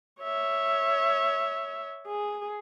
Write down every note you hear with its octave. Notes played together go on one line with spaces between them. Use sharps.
C#5 E5
G#4